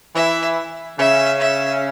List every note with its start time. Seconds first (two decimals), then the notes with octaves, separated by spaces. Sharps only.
0.15 E3 E4 E5
0.98 C#3 C#4 E5
1.40 E5